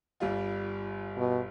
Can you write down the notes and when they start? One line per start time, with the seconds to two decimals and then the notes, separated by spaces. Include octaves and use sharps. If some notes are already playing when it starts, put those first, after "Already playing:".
0.20 G1 G3 F4
1.17 B2